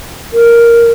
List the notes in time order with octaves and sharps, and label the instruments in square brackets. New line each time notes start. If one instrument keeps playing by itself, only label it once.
[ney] A#4